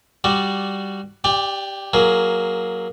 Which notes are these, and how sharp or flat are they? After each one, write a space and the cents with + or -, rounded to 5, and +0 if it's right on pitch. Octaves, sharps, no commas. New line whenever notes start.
G3 +0 F#4 +10 D5 +0
G4 +0 D5 +0 G5 +45
F#3 +0 A#3 +0 G#4 +15